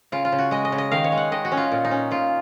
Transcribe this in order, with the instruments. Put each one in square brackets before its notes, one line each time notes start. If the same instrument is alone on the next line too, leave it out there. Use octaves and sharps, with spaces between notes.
[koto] C#3 F4
F4
C#3
F#4
G#3 D#5
D#5
C#3
D#5
D#3 F5
C#5
G#3
F#5
D#3 D#5
F#4
C#4
F4
A#2
D#4
C#4
A#2 F4